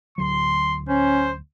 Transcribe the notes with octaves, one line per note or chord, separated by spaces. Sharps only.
D1 D2 F#3 C6
C#4 C5